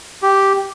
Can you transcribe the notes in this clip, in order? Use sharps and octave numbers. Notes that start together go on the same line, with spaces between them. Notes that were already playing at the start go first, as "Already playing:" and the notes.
G4